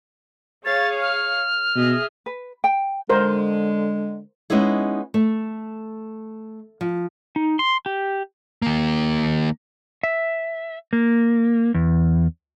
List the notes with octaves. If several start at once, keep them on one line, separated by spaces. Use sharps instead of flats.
G#4 C#5 F5 A6
F6
B2 G#4 D#5 E5
B4
G5
D3 G#3 A#4 C5
G#3 B3 C#4 D#4 E4 G#4
A3
F3
D#4
C6
G4
D#3 A#3
E5
A#3
E2